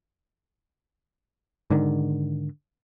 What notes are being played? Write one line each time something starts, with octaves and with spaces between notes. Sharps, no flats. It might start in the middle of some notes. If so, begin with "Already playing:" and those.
G#2 D3 D#3